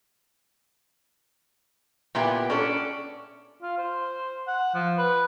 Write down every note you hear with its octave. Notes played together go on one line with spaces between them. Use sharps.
A#2 B3 E4 G4
C#4 D4 A4
F4
C5
F#5
F3
B4